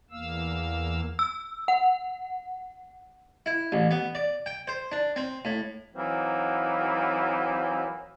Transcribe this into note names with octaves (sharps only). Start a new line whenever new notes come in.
E2 A#3 F5 E6
E6
F#5
E4
A1
B3
D5
G5
C5
D4
C4
A2
E3 F#3 A#3 C4 D#4